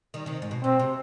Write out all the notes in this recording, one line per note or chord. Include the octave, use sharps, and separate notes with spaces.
D#3 G3
C3 D#3
G#2
B2
B2 C4
C3